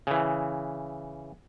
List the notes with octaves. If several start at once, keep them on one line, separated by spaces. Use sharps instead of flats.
C#3 E3